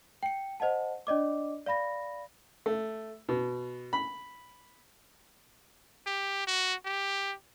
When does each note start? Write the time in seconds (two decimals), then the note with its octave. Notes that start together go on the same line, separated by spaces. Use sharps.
0.23 G5 C#7
0.60 C5 D#5 F#5 A5
1.07 D4 D5 D#5 D6
1.66 D5 F5 B5 A#6
2.66 A3
3.29 B2
3.93 B5
6.06 G4
6.47 F#4
6.85 G4